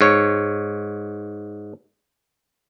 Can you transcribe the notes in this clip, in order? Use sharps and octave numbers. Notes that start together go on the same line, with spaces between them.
G#2 C#5